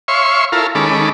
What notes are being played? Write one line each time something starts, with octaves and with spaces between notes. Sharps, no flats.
C#5 E5 F5 C6 C#6
E4 F4 A4 A#4 F5
D#3 G#3 C#4 A4 B5 D6